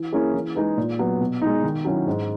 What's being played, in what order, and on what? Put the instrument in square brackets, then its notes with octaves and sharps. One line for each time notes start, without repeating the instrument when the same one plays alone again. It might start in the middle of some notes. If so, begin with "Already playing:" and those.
Already playing: [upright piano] E3
A#3 C#4 E4 G#4
E3
G#3 D#4 G#4 B4
A#2
F#3 B3
B2
G#3 D#4
D#3
F#3 C#4 E4
G#2